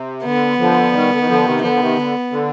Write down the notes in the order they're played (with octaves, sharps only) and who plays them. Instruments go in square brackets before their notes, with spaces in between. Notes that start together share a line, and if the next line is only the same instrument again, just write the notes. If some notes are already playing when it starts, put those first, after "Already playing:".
Already playing: [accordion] C3
[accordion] D3 [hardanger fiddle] B3
[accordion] D3 F3
D#3 G3
D3
D#3
D3 F3
C3 D#3
[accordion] D3 F3 [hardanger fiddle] B3
[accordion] F3
C3 D#3
D3
D3